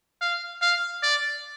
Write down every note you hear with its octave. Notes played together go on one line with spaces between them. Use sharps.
F5
F5
D5